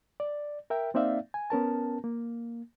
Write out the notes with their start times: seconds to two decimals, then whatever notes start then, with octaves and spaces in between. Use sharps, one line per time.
0.20 D5
0.70 A#4 E5 G5
0.94 A#3 C4 D#4 D5 E5 F5
1.34 G#5
1.50 B3 C#4 A#4 A5
2.04 A#3